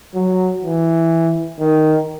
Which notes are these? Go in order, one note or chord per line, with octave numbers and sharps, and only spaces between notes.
F#3
E3
D#3